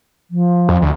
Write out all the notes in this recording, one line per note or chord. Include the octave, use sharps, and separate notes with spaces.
F3
F2
D2